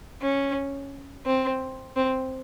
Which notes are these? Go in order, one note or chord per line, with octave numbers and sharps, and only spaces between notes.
C#4
C4
C4